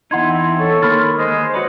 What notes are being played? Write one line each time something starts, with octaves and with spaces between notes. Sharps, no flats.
E2 D#4 E4 F#5 C6 G#6
C4
A4 C#5
D#3 A#3 B5 C6 F6 A6
G#3 C5
F#4 B4 C#5 D5